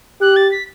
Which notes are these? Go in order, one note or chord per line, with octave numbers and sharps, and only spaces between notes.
G4 F#6
A6
B6